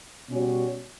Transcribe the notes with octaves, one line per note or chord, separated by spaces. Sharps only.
B2 G3 C#4 F#4 C#5